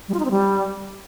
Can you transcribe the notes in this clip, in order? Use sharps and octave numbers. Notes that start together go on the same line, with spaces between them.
G3
F4
D#4
C4
G3